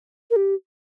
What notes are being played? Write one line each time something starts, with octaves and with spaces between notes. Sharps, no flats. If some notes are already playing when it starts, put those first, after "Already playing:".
A#4
G4